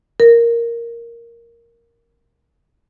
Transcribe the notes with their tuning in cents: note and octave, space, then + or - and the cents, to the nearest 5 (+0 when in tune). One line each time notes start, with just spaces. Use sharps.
A#4 +0